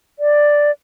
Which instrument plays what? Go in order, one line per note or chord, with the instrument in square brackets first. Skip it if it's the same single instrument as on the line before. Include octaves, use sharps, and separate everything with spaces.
[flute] D5